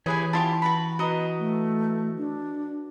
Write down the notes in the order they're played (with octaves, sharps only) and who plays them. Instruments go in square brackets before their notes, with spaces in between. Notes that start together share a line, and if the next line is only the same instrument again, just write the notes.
[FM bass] E3 [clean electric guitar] E4 G4 C#5 [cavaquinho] G#4 B4 G#5
[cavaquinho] E4 F4 G4 [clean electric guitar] A5
[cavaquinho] F#4 B4 B5
[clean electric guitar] F#4 B4 [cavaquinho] D#5 A#5
[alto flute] A3
D4